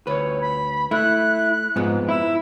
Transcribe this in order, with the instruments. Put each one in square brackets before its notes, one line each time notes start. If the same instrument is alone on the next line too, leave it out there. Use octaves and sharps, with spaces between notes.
[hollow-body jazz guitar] D2 B4 [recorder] C#5
[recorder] B5
[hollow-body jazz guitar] A3 [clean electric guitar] E4 [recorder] F#6
[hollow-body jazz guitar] F2 F3 B3 [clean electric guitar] G#2
[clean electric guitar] E4 [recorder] E6